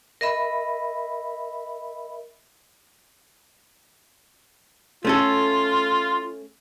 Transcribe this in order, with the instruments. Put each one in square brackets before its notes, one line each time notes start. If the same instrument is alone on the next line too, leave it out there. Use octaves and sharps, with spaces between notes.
[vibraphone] A#4 D#5 E5 B5
[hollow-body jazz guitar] A3 C#4 A4 [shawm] F4